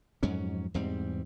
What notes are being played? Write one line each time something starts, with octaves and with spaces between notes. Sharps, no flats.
F2 G#2 F#3 C#4
E2 G#2 G3 C4